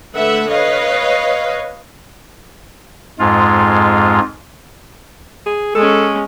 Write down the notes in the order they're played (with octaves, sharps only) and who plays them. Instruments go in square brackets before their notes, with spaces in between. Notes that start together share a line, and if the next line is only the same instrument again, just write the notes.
[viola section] D3 A3 B4 E5 F#5
B4 C#5 D#5 F5
[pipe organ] F2 G#2 G#3 F4
[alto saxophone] G#4
[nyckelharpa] G#3 C#4 [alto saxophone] A4